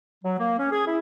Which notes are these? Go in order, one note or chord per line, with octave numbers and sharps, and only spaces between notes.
F#3
A#3
C#4
G#4
E4